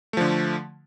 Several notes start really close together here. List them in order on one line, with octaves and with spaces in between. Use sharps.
A3 F3 D3